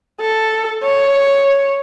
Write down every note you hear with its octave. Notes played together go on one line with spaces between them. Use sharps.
A4
C#5